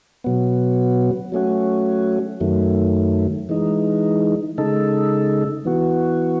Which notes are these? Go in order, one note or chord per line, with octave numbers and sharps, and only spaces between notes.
B2 F#3 B3
F#3 A3 C#4 F#4
F#2 D#3 F#3 A3
E3 G#3 D#4
C#3 G#3 D#4 A4
E3 B3 F#4